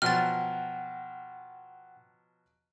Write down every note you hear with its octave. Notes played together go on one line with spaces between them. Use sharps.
B2 F3 F#3 F#5 G5 F6 A6